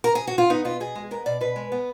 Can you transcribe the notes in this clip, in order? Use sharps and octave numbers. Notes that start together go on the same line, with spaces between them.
A#4
G#4
F#4
F4
B3 D#4
B2 F4
B2 G#4
G#3
B3 A#4
B2 D5
B2 B4
G#3
B3